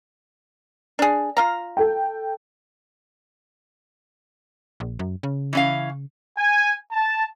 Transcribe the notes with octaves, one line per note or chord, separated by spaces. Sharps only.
D4 G#4
F4 F5 A#5
A4 G5
A#1
F#2
C#3
E3 C#4 F5
G#5
A5